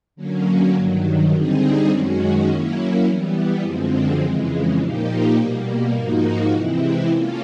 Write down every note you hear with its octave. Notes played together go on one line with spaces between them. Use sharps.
D3 F#3 A#3 C#4
G2 D#3 F#3
D3 G3 C4 D#4 G#4
F#2 D#3 G#3 C#4 F#4
F#3 A#3 C#4 E4
E3 G3 B3
F#2 D3 F3 G#3 C4
F2 C#3 E3 G#3
A#2 F3 A#3 D#4 G4
B2 G3 A#3
G#2 F3 A#3 D#4 F#4
C3 E3 G#3 C4 E4
A#3 C#4 F4 A4